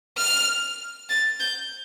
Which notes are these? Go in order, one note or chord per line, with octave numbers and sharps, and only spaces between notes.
F6
A6
G6